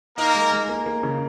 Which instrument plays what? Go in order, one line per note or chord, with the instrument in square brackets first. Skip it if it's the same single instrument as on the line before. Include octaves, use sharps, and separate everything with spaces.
[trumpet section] A#3 A#4 [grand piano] D#4
[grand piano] G#3
G#3
A#3
A#3
C#3